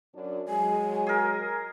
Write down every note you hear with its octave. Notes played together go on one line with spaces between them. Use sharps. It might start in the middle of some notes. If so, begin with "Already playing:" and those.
F#2 D4
F#3 G#3 G#5
G#4 A#4